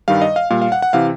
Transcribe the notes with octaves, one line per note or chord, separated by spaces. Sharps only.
G2 D#3 G3 F5
D#5
F5
A#2 G3 F5
F5
F#5
F#5
C3 E3 F5